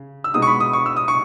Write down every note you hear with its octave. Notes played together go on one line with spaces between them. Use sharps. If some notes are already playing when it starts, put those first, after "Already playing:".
Already playing: C#3
E6
B2 G#3 D#4 D#6
C#6
B5
D#6
C#6
E6
D#6
C#6